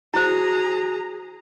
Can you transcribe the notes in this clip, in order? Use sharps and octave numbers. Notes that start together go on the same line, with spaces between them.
E4 F#4 G#4 C5 A#5